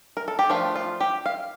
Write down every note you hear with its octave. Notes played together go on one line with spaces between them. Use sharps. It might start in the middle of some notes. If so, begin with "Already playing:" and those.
A#4
A4
G4
F3 A3 D4 F4
F4
G4
F5